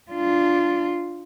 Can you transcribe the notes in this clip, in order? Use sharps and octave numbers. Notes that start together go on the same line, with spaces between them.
D4 F4